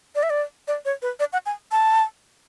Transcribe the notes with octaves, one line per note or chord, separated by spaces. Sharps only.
D5
E5
D5
D5
C#5
B4
D5
F#5
G#5
A5